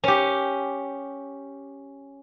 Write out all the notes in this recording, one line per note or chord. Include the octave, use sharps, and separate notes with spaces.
C#4 G4